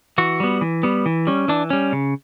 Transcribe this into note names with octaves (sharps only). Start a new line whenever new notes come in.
E3 F#4
G3 B3
E3
G3 B3
E3
G3 C#4
E3 D4
G3 C#4
C#3